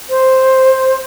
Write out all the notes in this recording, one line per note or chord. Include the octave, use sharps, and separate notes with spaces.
C5